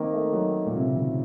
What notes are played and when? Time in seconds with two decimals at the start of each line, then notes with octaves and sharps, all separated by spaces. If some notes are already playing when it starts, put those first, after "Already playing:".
Already playing: D#3 A#3 C4
0.13 A3
0.33 F#3
0.66 A#2
0.75 C3
0.85 C#3
0.95 D#3